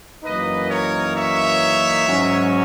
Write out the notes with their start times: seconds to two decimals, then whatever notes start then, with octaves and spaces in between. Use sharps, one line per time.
0.23 F#2 E3 A#3 D#4 B4 D#5
0.69 A#4 C#5
1.14 C#5 E5
2.06 G#2 F#3 C#4